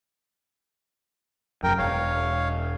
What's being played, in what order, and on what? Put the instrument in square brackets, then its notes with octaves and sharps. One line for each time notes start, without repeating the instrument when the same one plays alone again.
[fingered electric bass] F1 F#2 [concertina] A#4 G5
[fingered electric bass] E1 [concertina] C#5 F5